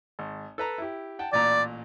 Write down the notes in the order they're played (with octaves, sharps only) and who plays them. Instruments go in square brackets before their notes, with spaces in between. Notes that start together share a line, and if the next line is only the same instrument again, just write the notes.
[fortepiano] G#1
A4 B4 A#5
E4 G4
F#5 G5 A5
[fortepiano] A1 A#2 A#5 [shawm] D5